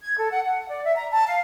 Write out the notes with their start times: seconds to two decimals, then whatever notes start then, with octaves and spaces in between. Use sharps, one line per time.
0.02 G#6
0.17 A4
0.31 F#5
0.45 F#5
0.69 D5
0.84 E5
0.96 A#5
1.11 A5
1.27 F5